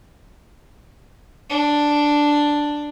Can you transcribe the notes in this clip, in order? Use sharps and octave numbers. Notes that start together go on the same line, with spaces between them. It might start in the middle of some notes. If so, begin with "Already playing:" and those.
D4